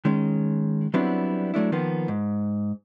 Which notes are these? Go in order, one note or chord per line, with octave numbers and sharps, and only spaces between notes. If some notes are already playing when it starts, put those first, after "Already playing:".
D#3 G#3 C#4
F#3 G3 B3 C4 D4 E4
F#3 A3 D4 E4
D#3 F3 A#3 B3
G#2